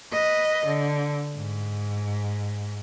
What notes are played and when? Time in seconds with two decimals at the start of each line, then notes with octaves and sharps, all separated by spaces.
0.12 B4 D#5
0.65 D3
1.36 G#2